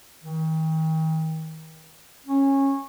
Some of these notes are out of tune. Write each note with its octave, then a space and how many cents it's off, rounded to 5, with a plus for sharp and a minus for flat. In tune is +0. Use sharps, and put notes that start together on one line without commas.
D#3 +35
C#4 -15